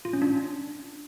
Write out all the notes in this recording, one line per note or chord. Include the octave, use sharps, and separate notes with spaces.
F4
C#4
D4